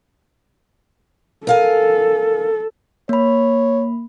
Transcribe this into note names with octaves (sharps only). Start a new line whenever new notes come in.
A4 A#4 F5 G#5
A#3 C#5 B5